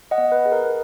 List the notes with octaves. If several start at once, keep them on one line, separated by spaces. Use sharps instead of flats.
D#5 F#5
B3
B4
G#4
A#4